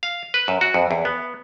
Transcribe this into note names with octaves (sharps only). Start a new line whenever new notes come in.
F5
B4
F#2
F#4
F2
E2
B3